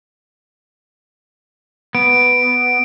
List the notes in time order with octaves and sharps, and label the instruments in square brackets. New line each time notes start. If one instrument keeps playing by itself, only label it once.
[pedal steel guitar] B3 [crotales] D7